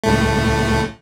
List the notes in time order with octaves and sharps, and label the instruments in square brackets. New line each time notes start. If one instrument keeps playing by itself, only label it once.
[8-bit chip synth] C#2 A2 A3